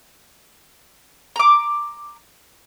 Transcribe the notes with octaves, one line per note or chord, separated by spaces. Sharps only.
A#5 D6